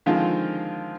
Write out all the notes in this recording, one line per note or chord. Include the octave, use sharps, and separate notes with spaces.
D3 D#3 F3 G#3 C4 F4